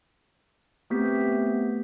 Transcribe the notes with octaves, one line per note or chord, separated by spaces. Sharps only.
A3 B3 C4 G4 G6 B6